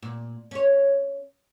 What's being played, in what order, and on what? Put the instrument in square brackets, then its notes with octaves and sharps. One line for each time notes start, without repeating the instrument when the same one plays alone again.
[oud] A#2
C#4 C#5